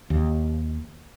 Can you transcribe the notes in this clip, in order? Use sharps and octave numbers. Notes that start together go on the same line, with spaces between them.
D#2